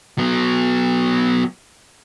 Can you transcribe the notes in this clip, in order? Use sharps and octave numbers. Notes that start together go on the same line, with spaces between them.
F#3 B3